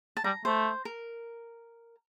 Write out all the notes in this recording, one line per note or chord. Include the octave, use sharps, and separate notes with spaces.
A5
G3 A#5
A3 C5
A#4